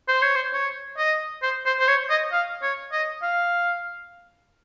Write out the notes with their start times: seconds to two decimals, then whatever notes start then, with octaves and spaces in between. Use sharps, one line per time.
0.08 C5
0.22 C#5
0.36 C5
0.53 C#5
0.98 D#5
1.43 C5
1.66 C5
1.79 C5
1.88 C#5
2.10 D#5
2.33 F5
2.63 C#5
2.92 D#5
3.22 F5